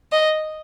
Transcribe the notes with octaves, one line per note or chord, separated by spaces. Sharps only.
D#5